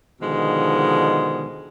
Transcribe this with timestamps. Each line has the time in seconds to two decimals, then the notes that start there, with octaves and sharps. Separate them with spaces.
0.21 B2 D3 D#3 F3 G#3